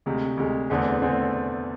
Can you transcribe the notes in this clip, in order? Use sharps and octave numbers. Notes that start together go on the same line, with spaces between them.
D2 C3 G#3
D2 C3 G#3
E2 D3 A3 C4 G#4
D3 A3 C4 G#4